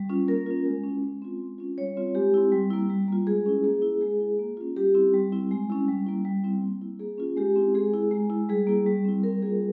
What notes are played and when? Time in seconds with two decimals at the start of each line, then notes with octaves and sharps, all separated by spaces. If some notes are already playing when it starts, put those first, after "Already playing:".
Already playing: G3
0.09 C#4 F4
0.28 A#3 A#4
0.46 C#4 F4
0.65 G#3
0.84 C#4 E4
1.03 G#3
1.22 C4 F4
1.41 G#3
1.58 C#4 F4
1.77 G3 C#5
1.97 C4 F4
2.15 G#3 G4
2.34 C4 E4
2.52 G3
2.70 A#3 E4
2.90 G3
3.08 A#3 F4
3.27 G#3 G#4
3.46 C#4 E4
3.64 A#3 G#4
3.82 E4
4.01 G#3 G#4
4.20 E4
4.39 A#3
4.57 C#4 F4
4.77 G3 G4
4.95 C4 E4
5.14 G3
5.32 C4 E4
5.51 G#3
5.70 C#4 E4
5.88 G3
6.06 A#3 E4
6.25 G3
6.44 C4 E4
6.62 A#3
6.82 E4
7.00 A#3 G#4
7.18 C#4 F4
7.37 G#3 G4
7.56 C4 E4
7.74 G#3 G#4
7.94 E4
8.11 G#3
8.30 E4
8.49 G3 G#4
8.67 A#3 E4
8.86 G3
9.05 C4 E4
9.23 G3 A#4
9.42 A#3 F4 G#4